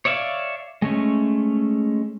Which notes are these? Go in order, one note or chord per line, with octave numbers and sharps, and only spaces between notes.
C#5 D5 E5 F5
G#3 A3 C#4